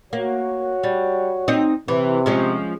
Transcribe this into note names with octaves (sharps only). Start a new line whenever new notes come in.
A#3 F#4 C#5
G3
C4 D#4
C3 E3
F3 G#3 C#4